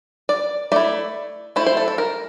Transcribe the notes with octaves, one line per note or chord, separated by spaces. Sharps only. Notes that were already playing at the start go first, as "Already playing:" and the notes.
D5
A3 E4 D5
A3 E4 C5
C5
A4
A4
A#4